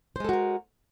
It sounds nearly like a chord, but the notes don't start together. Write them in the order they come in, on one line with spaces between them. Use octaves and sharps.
C5 G#3 A4 F#4 A#4